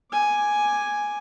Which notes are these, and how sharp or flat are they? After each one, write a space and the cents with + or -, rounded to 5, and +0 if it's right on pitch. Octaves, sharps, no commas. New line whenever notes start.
G#5 +0 D6 +10